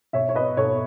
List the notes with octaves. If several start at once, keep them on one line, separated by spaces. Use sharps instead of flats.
B2 C#5 E5
C#5
B4 D#5
B2 A4 C#5